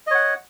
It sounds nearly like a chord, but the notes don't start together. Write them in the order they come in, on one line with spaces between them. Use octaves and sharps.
D#5 C#5 F#5